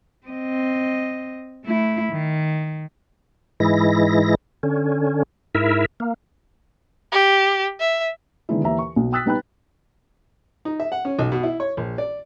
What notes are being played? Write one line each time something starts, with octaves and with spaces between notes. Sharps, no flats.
C4 D#5
A3 E4
D#3
G#2 E3 G#3 E4 A#6
D3 C#4
G#2 E4 A#4 E5
A#3
G4
E5
D3 D#3 G#3 B3 E4
D#2 E3 E5 A#5
C#6
B1
G5 D#6 E6 F#6 A6 B6
G3 B3 D#4 G5 B5 F#6
D#4
E5
F#5
C#4
B1
B2
E4
C#5
A#1
D5